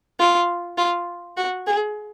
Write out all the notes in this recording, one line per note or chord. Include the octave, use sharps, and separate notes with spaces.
F4
F4
F#4
G#4